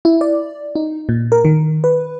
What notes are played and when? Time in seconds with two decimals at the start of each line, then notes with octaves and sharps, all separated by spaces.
0.05 E4
0.21 D5
0.75 D#4
1.09 A#2
1.32 A#4
1.45 D#3
1.84 B4